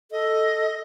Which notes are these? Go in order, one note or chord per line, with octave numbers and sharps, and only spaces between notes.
A4 D#5